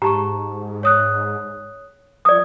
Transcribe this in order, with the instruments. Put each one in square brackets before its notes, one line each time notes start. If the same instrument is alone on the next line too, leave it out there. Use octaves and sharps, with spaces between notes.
[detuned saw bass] G#2 [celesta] G4 A5 C#6 [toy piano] A#5
[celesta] C#5 D#6 F#6
[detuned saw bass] F3 [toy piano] D5 D#6